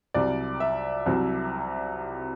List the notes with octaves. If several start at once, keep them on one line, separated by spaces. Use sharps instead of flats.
C2 C3 F#3 D5
E5
C2 C3 F#3